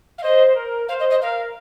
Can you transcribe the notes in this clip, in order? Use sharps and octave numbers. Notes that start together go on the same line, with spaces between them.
F5
C5 D#5
A#4
C5 F5
D#5
D#5
A#4 F5